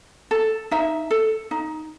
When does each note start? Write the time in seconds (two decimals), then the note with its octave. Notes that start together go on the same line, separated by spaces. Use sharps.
0.31 A4
0.71 D#4 E5
1.11 A4
1.51 D#4